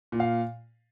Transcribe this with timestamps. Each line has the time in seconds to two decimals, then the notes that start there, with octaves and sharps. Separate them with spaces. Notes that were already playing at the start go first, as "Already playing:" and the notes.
0.12 A#2
0.20 F5